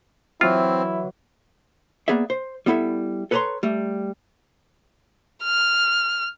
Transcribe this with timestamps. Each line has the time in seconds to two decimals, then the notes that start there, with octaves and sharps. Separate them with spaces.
0.41 E3 F#3 C4 E4 F4 F6
2.08 A#3 B3 G#4 D5 E5
2.30 C5
2.66 G3 B3 E4 A4 E5
3.31 A4 B4 C#5 A5 A#5 C6
3.63 G3 A3
5.43 F6